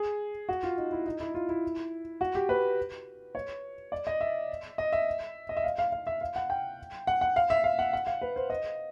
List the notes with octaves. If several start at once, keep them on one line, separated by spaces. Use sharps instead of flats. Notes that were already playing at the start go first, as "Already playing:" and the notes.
Already playing: G#4
F#4
F4
D#4
E4
D#4
E4
F4
E4
F#4
G4
B4
C#5
D5
D#5
E5
D#5
E5
D#5
E5
F5
F5
F5
E5
F5
F#5
G5
F#5
F#5
F5
E5
F5
F#5
F#5
F5
B4
C5
D#5